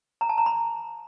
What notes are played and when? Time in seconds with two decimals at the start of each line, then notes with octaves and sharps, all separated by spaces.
0.21 A#5
0.29 A5
0.38 A#5
0.46 B5